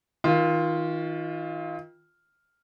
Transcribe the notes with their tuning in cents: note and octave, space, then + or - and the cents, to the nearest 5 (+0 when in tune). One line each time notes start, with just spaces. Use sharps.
D#3 +35 F4 +0